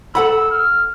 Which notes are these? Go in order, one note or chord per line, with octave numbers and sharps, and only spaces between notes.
A4 F#5 B5 E6
F6